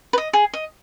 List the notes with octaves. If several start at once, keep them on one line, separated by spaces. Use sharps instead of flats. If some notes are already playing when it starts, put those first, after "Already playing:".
B4
D#5
G#4
D#5